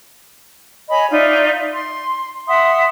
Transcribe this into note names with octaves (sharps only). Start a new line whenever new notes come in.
C#5 D#5 G#5 B5
D#4 F4 D5 E5
C6
E5 F#5 C6 D#6